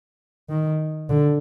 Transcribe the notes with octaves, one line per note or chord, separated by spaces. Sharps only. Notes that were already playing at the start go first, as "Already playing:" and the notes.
D#3
D3